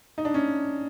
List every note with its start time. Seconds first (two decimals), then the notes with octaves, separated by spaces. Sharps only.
0.18 D#4
0.25 D4
0.34 C#4